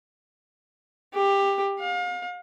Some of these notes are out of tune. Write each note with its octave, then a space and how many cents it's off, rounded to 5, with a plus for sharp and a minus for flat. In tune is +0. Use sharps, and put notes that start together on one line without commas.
G4 +15
F5 +35